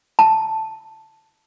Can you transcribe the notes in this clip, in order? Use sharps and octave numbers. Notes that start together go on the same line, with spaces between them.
A5